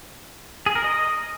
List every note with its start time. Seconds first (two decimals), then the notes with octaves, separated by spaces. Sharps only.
0.66 G#4
0.75 A#4
0.84 D#5